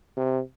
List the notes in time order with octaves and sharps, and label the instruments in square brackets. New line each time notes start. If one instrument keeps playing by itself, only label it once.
[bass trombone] C3